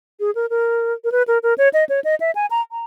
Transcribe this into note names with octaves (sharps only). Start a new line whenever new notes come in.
G#4
A#4
A#4
A#4
B4
A#4
A#4
C#5
D#5
C#5
D#5
E5
G#5
A#5
A#5